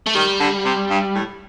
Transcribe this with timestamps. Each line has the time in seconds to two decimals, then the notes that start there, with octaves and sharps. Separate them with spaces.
0.07 A3
0.15 D#3 G3
0.40 D3
0.65 C3
0.90 G2
1.15 A2